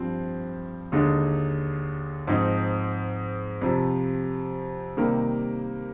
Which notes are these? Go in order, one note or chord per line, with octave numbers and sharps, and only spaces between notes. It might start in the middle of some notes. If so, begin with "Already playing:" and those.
Already playing: G2 F3 C4
D#2 D3 G#3 D#4
G#2 F3 C4 D#4
F2 C3 F3
C3 D#3 G3 A#3